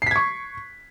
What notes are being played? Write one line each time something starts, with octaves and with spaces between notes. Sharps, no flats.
C#6 G#6 B6 C7